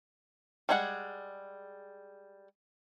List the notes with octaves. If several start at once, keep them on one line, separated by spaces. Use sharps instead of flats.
G3 G#3 D4 G#4 F#5